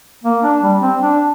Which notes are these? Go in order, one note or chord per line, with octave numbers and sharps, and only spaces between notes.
A#3
D4
G3
C4
D4